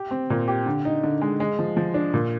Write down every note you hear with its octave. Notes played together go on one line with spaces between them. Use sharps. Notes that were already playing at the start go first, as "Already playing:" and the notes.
Already playing: G4
C4
A#2
G4
D3
D#4
D3
G#3
G#3
F3
F3
D4
A#2